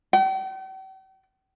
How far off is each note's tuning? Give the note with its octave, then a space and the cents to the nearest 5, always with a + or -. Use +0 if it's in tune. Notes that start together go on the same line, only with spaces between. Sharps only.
G5 -45